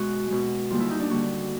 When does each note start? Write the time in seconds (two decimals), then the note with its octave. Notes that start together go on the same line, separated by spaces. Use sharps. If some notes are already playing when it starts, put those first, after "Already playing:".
Already playing: B2 G#3 F#4
0.30 B2 G#3
0.71 D#2 D3 G3 A#3 F4
0.80 E4
0.91 D#4
1.00 D4
1.10 D#2 D3 G3 A#3 F#4